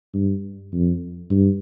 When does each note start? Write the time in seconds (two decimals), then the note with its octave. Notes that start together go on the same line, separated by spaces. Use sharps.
0.14 G2
0.73 F2
1.30 G2